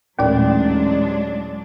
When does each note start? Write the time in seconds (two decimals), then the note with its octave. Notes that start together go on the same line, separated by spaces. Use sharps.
0.19 A1 D#2 A#2 F#3 G#3 D4 D5